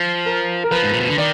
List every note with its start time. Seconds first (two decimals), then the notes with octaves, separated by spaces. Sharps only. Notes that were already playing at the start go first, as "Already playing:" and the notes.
Already playing: F3
0.26 A#4
0.64 A#4
0.71 F3 B4
0.83 G#2
0.91 A#2
1.00 B2
1.09 D3
1.18 D#3 D5